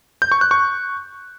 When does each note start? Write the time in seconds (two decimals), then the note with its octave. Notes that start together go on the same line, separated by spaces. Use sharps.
0.22 G6
0.32 C#6
0.41 F#6
0.51 C#6